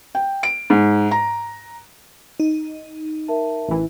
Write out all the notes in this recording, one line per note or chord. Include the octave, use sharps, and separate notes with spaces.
G5
D7
G#2
A#5
D#4
A#4 E5 A5
A1 E3